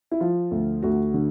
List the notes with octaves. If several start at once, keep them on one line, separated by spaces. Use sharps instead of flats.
E4
F3 F4
D2
D2 F#4
D3